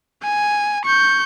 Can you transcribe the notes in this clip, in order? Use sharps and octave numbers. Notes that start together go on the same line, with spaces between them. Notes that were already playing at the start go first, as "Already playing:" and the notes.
G#5
C#6 G6